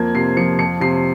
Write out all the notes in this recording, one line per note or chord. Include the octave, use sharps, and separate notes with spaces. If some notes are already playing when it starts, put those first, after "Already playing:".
Already playing: F2 A#3 G#6
C3 C7
F3 C#7
F2 C#7
C3 C7